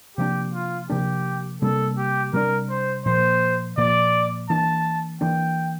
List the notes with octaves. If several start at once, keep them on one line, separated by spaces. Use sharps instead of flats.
C3 F3 A#3 D4 G4
F4
C3 F3 A#3 D4 G4
C3 G3 A#3 D4 A4
G4
C3 G3 A#3 D4 A#4
C5
A#2 F3 A#3 C5
A#2 F3 A#3 D5
E3 A#3 D4 A5
E3 A#3 D4 G5